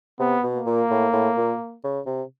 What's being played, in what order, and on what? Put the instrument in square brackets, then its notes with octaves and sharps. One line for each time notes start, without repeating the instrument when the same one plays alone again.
[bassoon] C3 [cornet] B3
[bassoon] B2
[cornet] A#3
[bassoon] A#2
A2
A2
A#2
C#3
C3